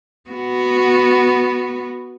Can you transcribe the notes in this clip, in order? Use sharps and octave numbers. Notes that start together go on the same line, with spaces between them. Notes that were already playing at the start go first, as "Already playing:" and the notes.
B3 F#4